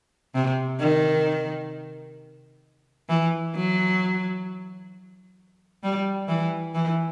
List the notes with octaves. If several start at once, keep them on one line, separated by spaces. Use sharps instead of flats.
C3
D#3
E3
F#3
G3
E3
E3